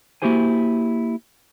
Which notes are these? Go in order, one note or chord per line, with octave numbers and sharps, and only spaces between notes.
A#3 E4 F#4 G4 C5 G#5